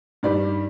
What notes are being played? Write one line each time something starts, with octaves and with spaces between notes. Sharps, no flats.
G2 D#3 G3 D5